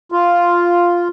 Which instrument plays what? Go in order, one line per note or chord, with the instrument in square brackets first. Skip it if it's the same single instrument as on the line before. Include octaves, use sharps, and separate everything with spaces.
[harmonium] F4